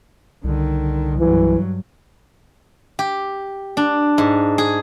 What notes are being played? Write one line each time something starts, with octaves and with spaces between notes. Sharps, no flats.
C2 D3 D#3
G2 E3 F#3
G4
D4
G#2
G#4